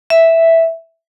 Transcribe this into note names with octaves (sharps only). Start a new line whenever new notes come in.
E5